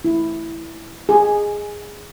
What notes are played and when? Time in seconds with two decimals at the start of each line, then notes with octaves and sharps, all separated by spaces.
0.05 E4
1.09 G#4